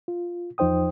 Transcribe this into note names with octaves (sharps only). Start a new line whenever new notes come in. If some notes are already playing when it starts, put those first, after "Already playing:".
F4
E2 F3 D#4 C5 G5 D#6